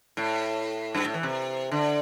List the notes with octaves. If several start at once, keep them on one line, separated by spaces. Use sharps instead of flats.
A2
G2
A2
E3
C3
D3